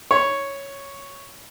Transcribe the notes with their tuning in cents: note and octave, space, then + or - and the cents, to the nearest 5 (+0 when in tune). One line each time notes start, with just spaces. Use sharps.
C#5 +0 B5 +0